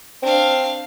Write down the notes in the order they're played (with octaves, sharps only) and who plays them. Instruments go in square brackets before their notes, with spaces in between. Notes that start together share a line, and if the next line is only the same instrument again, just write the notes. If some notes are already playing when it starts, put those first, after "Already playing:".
[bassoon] C4 [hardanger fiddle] D4 F5